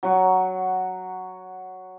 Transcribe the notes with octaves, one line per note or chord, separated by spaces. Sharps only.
F#3 F#4